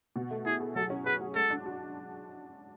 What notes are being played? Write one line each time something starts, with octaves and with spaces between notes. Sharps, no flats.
B2
A3
E4 G#4
G#4
F#3 A4
C#4
G#4 B4
F#3
G#3 A4
D4
F#4